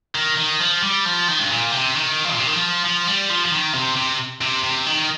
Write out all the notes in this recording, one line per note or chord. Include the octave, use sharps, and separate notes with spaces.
D#3
D#3
F3
G3
F3
D#3
G2
A#2
C3
D#3
F3
A#2
C3
D#3
F3
F3
G3
F3
F3
D#3
C3
C3
C3
C3
D#3